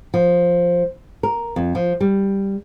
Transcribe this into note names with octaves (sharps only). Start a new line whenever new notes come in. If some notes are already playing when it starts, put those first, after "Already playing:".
F3
A#4
F2
F3
G3